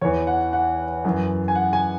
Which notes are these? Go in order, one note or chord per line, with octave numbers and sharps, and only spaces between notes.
E2 E3 C#5
F#5
F#5
F#2 E3
G#5
F#5
G#5